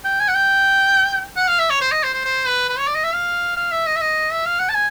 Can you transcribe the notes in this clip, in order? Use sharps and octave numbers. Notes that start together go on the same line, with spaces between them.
G5
G#5
F#5
G5
F#5
F5
E5
C#5
C5
D#5
C5
C5
C5
B4
B4
C#5
D5
D#5
E5
F5
F5
E5
D#5
E5
D#5
E5
F5
F#5
A5
G#5